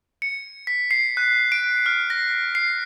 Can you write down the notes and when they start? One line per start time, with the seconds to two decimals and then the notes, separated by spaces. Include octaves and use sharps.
0.22 C#7
0.67 B6
0.91 C7
1.17 F#6
1.52 D7
1.86 F6
2.10 A#6
2.55 C7